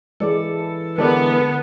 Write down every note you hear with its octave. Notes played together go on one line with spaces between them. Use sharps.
E3 G#3 A4 D5
D3 G#3 B3 A#4 D5 A5